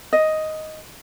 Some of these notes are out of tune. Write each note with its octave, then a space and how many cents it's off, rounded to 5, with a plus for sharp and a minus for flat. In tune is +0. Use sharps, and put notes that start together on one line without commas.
D#5 +5